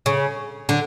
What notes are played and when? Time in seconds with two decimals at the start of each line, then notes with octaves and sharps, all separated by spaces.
0.06 C#3
0.69 D3